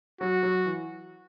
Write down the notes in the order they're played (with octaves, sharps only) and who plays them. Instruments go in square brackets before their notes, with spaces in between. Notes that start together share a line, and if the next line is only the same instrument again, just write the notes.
[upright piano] F#3 [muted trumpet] F#4
[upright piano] F#3
E3